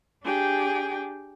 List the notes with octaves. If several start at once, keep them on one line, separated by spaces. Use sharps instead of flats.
D4 G4 G#4 G5